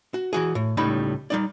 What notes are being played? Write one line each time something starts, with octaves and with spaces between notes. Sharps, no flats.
F#4
E3 F#4 G#4
A2
C#2 A2 G3 D#4 B5
G3 D#4 D5